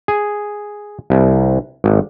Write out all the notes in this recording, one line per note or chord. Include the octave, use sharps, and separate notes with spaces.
G#4
C2
G#1